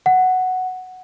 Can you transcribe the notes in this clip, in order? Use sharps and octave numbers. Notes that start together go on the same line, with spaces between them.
F#5